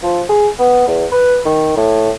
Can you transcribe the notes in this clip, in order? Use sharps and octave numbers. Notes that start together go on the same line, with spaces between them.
F3
G#4
B3
E2
B4
D#3
A2